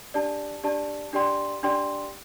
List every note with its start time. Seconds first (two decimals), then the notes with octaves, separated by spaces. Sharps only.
0.14 D4 G4 D5 A5
0.64 D4 G4 D5 A5
1.13 D4 G4 D5 G5 C6
1.63 D4 G4 D5 G5 C6